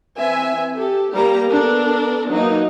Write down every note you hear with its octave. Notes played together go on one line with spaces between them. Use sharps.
E3 C4 E5 G#5
G4 A4
G3 A#3 G4 A#5
B3 D4 A4 A#4
E3 F#3 A#3 D#4